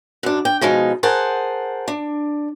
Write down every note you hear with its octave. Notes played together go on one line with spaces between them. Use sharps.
F#2 D4
G5
B2 F3 G#3 D#4
G#4 A#4 C5 F#5 A5
D4